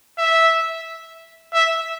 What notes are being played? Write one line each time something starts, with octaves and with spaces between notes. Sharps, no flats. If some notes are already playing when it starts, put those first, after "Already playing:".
E5
E5